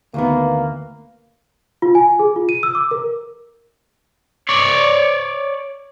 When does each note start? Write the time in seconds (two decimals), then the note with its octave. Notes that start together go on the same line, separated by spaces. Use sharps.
0.14 D2 D#3 A#3 B3
1.82 F4
1.95 G#5
2.19 G#4
2.36 F4
2.49 D#7
2.63 E6
2.75 D6
2.91 A#4
4.49 C#5 D5